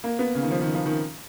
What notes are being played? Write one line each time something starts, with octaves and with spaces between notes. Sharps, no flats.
A#3
B3
C#3
D#3
F3
D#3
F3
D#3